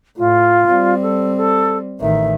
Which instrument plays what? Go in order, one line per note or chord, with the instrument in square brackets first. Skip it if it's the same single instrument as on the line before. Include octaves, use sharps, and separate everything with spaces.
[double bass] A2 [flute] F4
[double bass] G3 C4
[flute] A4
A4
[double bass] A1 D#3 [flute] E5